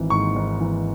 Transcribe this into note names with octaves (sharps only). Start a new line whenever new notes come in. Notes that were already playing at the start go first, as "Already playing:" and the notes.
Already playing: G#1 E3
G#2 C#6
G#1
E3